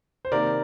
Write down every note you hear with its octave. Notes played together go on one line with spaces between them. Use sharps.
C5
C3 D#3 A#3 A#4 D5